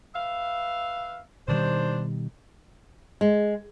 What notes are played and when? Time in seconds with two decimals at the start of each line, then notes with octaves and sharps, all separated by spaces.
0.14 B4 E5 F5
1.48 D#2 B2 D#3 G3 D4 C5
3.21 G#3